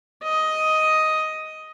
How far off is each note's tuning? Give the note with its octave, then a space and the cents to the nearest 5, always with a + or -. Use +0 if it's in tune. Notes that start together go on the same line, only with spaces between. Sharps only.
D#5 +10